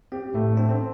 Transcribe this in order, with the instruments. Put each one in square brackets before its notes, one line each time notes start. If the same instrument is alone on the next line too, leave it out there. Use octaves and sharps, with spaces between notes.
[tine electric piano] C4 [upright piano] G4
[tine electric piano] A2 [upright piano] A3
[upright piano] C4 [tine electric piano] D4
[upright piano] C4